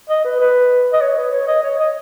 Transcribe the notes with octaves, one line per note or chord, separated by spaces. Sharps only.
D#5
B4
B4
D#5
C#5
B4
C#5
D#5
C#5
D#5